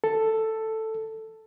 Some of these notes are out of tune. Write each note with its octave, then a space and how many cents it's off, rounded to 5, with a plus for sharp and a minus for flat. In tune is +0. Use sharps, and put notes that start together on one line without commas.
A4 +5